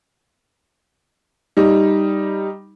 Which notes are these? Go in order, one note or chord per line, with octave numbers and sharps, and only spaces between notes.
G3 D#4